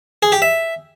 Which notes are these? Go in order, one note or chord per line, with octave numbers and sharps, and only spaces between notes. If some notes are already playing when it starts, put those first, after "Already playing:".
G#4
G4
E5